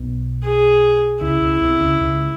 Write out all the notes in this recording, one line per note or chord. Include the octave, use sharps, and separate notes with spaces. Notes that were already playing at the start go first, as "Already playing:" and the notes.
Already playing: B1 B2
G#4
C#2 C#3 E4
C#2 C#3
C2 C3
C#2 C#3
C#2 C#3